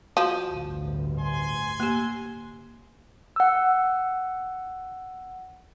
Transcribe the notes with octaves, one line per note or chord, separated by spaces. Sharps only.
F3 F#4
A1 D2 G2
G#5 C6
A#3 G4
F#5 E6